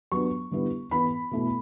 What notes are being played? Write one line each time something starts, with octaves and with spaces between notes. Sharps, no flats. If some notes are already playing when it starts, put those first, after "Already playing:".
F#3 B3 D4 C#6
D3 G3 B3 E4
E3 B3 E4 B5
B2 A3 E4